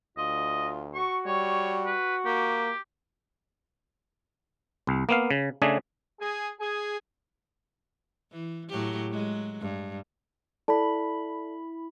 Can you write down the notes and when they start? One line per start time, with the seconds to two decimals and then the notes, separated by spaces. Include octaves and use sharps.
0.17 D2 F4 D#5
0.94 F#4 C#6
1.26 G3 C#5
1.86 B4
2.25 A#3 G4
4.87 C2
5.09 A#3 B3 F5
5.31 C#3
5.62 C#3 A3 D4 G#4
6.19 G#4
6.60 G#4
8.32 E3
8.69 A2 F#3 G4
9.10 F#3 G#3
9.61 G2
10.68 E4 A4 D5 A5 B5